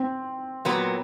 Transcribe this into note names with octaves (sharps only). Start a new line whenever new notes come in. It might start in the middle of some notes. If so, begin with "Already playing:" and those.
Already playing: C4
A#2 F#3 B3